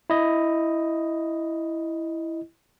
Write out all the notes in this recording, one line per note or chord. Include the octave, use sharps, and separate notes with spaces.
E4 D#5